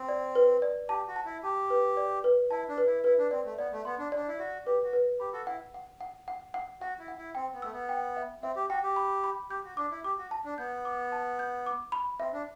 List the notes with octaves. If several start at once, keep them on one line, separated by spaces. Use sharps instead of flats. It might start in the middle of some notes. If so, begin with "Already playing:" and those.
Already playing: C4
D5
B4
D5
G4 A5
F#4
A5
E4
G4 A5
B4
D5
B4
E4 A5
D4
B4
E4
E4 B4
D4
C4 D5
A3
B3 D5
A3
B3 C6
D4
D4 D5
E4
F#4 D5
G4 B4
F#4
B4
G4 B5
F#4 A4
E4 F#5
F#5
F#5
F#5
F#5
F#4 F#5
E4
F#5
E4
C4 G5
B3
A3 E6
B3
G5
E5
C4 E5
G4
F#4 G5
G4
B5
B5
G4 G6
F#4
D4 D6
E4
G4 D6
F#4
A5
D4
B3 G6
D6
A5
G6
D6
B5
C4 E5
D4